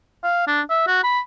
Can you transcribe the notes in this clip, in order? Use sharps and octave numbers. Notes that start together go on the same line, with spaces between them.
F5
D4
E5
F#4
B5